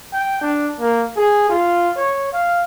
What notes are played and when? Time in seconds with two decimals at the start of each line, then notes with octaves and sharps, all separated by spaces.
0.13 G5
0.41 D4
0.80 A#3
1.16 G#4
1.49 F4
1.96 C#5
2.33 F5